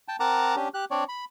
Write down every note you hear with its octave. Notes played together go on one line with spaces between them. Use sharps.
G5 A5
C4 A#4 F#5 A5 A#5 D6
C#4 D4 G4
G4 F#6
C4 D4 C#5 D5
B5